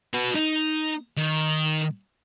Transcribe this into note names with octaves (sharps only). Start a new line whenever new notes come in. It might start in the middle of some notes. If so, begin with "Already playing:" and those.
F#4 B4
D#4
D#3